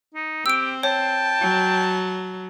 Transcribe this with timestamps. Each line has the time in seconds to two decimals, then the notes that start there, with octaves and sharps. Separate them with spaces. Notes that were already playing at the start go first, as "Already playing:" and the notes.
0.14 D#4
0.46 C4 G4 E6 D7
0.83 C#5 G5 A5
1.41 F#3